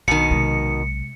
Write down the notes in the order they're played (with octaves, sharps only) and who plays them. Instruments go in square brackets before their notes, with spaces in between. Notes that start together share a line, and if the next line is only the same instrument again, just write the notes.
[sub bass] B1 [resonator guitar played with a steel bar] B2 D#3 [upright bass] B3 [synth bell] C#7
[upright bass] C3 G#3